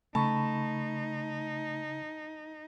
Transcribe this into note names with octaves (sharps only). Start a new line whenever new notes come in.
C#3 A3 D#4 A5 B5 C#6